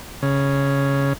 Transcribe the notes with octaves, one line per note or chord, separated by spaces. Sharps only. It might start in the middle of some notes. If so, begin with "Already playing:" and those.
C#3